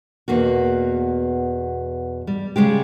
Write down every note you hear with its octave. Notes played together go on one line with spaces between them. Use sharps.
E2 B2 A#3 F#4
G3
C#3 G3 G#3 G4